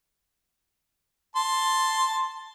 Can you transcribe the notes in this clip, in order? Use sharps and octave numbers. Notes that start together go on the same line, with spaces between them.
A5 C6